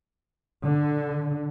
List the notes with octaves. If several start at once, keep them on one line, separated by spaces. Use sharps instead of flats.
D3